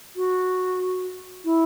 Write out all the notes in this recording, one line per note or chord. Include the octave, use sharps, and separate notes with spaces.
F#4
E4